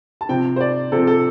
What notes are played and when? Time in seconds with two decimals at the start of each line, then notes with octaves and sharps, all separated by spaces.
0.21 A5
0.29 C3 F3 C4 G5
0.56 C5
0.61 D5
0.92 C3 F3 C4 A4
1.07 A4